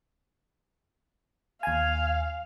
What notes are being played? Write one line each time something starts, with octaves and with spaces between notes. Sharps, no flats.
D#2 F5 G#5